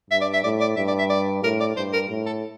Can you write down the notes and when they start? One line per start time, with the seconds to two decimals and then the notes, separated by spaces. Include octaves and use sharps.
0.10 G2 E5
0.21 D5
0.33 E5
0.44 A2 D5
0.61 D5
0.76 G2 E5
0.88 D5
0.99 E5
1.10 D5
1.43 A2 A#4
1.60 D5
1.77 G2 C5
1.93 A#4
2.10 A2
2.26 A4